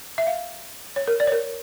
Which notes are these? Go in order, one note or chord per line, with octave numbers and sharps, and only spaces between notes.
E5
F5
C#5
A#4
D5
C#5
A#4